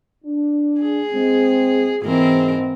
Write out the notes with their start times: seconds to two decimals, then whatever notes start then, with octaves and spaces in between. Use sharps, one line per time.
0.25 D4
0.81 G#4
1.12 G#3 C4
2.03 G#2 E3 C4 A#4